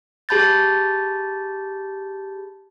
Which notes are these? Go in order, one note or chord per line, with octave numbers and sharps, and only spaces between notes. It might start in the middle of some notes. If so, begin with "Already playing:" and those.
G4 G#4 A5 B5 G6 A6